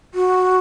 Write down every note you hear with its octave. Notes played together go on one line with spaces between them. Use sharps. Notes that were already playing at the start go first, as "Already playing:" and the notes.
F#4